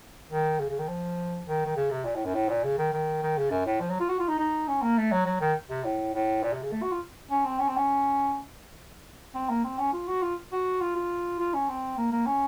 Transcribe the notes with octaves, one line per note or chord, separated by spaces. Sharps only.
D#3
C#3
C#3
D#3
F3
D#3
D#3
C#3
C3
A#2
A2
F#2
A2
A#2
C#3
D#3
D#3
D#3
C#3
F#2
A2
F3
F#3
F4
F#4
F4
D#4
D#4
C#4
A#3
A3
F#3
F#3
D#3
C3
A2
A2
A#2
C3
C#3
A3
F#4
F4
C#4
C4
C#4
C4
C#4
C4
A#3
C4
C#4
F4
F#4
F4
F#4
F4
F4
F4
C#4
C4
A#3
A#3
C#4